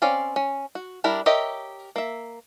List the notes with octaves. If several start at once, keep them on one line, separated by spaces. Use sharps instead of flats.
C4 C#4 D5 F5
C#4
F#4
G3 D4 E4 A#4
G4 A#4 C#5 D#5 E5
A#3 E5